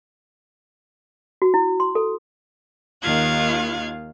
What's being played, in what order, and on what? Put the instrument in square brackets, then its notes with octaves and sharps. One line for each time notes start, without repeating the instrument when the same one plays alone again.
[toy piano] F#4
E4
C6
A4
[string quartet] D#2 D#3 F4 F5 F#6 G#6